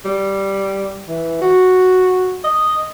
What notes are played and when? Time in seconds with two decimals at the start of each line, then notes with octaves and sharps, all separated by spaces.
0.05 G3
1.08 E3
1.41 F#4
2.44 D#5